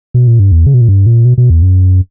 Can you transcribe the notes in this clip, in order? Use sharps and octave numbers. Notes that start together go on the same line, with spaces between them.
B2
A#2
G2
E2
C#3
B2
A#2
G2
A#2
B2
B2
E2
F#2